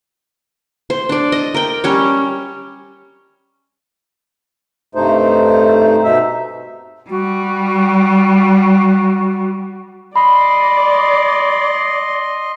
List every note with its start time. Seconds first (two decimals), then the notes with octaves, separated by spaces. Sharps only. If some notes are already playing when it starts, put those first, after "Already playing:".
0.90 C5
1.09 D4 D5
1.32 D#5
1.54 A#4 G5
1.84 G3 C#4 C#5
4.95 G2 C3 A3 D#4 C5
6.04 B2 D#4 E5
7.10 G3 F#4
10.16 D5 D#5 B5 C6